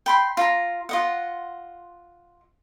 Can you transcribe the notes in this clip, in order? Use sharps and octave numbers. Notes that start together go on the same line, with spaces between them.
G5 B5 C6
F4 A#5
F4 D#5 F#5